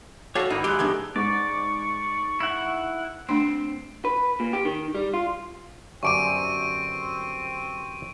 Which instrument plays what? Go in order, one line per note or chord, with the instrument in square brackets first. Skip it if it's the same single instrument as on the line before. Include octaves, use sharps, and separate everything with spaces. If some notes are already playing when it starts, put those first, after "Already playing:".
[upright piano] F#4 A4 [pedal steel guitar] C#5 F5 A5 [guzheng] D5 E5
[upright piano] G#1 [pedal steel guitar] D#4 [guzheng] E4
[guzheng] G#3 [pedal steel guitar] G4 F#6
[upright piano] A#1 G#6 [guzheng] A3 B3 D#4
[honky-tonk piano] G#2 [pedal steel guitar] D5 [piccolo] C#6
[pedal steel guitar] E4 F#5
[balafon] A3 D4 C6 [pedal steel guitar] C4
[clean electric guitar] B4
A#2
G4
D#3
G3
F4
[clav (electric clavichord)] G1 F#2 D5 [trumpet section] C4 [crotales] C#6 D7 D#7